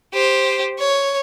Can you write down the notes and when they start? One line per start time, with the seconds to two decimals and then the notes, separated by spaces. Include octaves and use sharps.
0.14 G4 C5
0.79 C#5